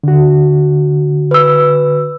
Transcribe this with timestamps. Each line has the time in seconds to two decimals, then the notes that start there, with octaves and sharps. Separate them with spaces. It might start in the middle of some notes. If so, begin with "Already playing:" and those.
0.04 D3 F#4
1.31 B4 E6